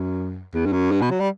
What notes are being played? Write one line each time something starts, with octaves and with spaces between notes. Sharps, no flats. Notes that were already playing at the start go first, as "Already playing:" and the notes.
Already playing: F#2
E2
G2
F#2
G2
B2
F#3
G3